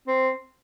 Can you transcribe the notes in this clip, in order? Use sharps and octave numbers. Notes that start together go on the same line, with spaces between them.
C4